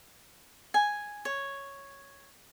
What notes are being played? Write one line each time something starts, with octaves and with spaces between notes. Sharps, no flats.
G#5
C#5